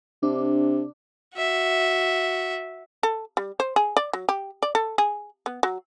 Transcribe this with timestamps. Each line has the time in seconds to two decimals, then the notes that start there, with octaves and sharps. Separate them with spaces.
0.23 C3 D4
1.35 F#4 E5
3.03 A4
3.37 G3
3.60 C5
3.76 G#4
3.97 D5
4.13 F#3
4.29 G4
4.63 D5
4.75 A4
4.98 G#4
5.46 B3
5.63 F#3